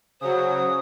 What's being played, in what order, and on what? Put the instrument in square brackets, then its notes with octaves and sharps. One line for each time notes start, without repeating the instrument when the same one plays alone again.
[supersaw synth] C#3 F#3 [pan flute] C5 [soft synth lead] D#6